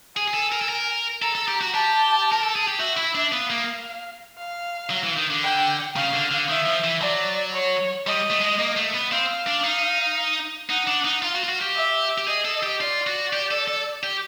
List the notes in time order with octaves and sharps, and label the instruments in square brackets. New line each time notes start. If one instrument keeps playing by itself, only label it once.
[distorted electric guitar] G#4 [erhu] G#5
[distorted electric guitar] G#4
A4
A#4
A4
A#4
[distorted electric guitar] A4 [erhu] A#5
[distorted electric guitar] A4
G4
F#4
[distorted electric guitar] G4 [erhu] A5
[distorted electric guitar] A#4
A4
G#4
G4
[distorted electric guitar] F#4 [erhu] E5
[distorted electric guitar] E4
D4
[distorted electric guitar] B3 [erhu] F5
[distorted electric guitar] A#3
[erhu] F5
[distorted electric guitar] F#3
E3
D#3
D3
[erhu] G5
[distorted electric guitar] C#3 [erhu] F5
[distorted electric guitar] D3
D3
[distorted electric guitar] D#3 [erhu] E5
[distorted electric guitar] F3
E3
[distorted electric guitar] F#3 [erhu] D5
[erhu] C#5
[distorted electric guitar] G3 [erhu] D#5
[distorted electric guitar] A3
G#3
A#3
A3
B3
[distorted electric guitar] C4 [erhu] F5
[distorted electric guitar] D4
D#4
[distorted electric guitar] D#4 [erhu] F#5
[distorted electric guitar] D4
D#4
[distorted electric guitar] F4 [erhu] F5
[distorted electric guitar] F#4
F4
F#4
G4
[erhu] E5
[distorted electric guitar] G4
[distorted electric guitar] G#4 [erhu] D#5
[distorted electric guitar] A4
G4
[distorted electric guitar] F4 [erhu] D5
[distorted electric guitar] F#4
G4
A4
A4
G4